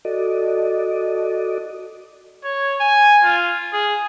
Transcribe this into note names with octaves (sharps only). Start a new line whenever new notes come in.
F#4 A4 D5 D#5
C#5
G#5
F4
G#4